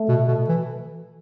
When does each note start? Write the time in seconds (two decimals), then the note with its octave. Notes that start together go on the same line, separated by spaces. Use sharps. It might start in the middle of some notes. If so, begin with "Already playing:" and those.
Already playing: A3
0.09 B2
0.28 B2
0.49 E3